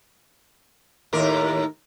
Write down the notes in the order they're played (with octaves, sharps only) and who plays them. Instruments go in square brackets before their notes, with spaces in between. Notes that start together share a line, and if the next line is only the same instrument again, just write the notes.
[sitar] D#2 A2 A#4